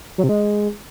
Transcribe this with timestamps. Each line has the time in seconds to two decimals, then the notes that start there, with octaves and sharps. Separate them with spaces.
0.18 F#3
0.24 C3
0.29 G#3